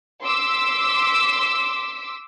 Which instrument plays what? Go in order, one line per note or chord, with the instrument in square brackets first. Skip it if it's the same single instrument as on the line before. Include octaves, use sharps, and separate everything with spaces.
[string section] C6 D6 E6 B6